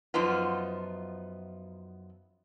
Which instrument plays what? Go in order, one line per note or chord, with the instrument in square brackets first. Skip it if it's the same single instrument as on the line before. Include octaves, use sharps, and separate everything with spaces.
[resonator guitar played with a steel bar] F#2 F3 B3 D#4 F4